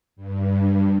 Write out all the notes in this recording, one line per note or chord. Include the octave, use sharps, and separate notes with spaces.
G2